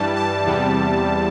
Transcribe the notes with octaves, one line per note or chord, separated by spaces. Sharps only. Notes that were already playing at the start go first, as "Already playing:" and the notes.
Already playing: G2 E3 G3 A5
A5
E2 C3 G3